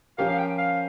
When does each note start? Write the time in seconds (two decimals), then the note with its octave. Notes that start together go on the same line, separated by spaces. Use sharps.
0.18 F3 C#4 G4 A#4 F5
0.29 F5
0.38 G5
0.58 F5